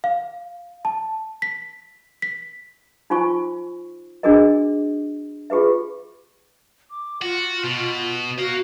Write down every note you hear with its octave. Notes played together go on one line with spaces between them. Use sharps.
F5
A5
B6
B6
D#4 F4 C5 G#5 C#6
D4 F#4 G#4 A#4 D#5
F4 G4 G#4 B4 E5
D6
F4 F#4
B2
F#4 F5 A#5